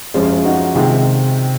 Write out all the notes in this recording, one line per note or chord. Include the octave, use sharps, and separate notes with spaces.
F#2 F3 G#3 C#4 F4
D#4 F#4
C3 D#3 G#3 F4 G#4